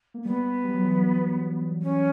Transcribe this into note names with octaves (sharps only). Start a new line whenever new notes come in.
A#3
G3 B3
G3
F#3
E3
F#3
C#4